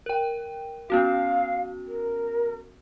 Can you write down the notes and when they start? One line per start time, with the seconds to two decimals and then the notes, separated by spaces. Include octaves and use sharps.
0.06 A#4 G5
0.90 B3 C#4 F#4 F5
1.87 A#4